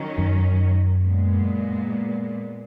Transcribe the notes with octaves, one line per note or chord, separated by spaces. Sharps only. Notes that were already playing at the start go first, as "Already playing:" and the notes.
Already playing: D#3 F#3 C#4
F#2
A#2 G#3 B3